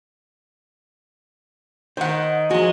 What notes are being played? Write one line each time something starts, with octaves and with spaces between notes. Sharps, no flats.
D#3 C5 F#5
F3 G#3 F#4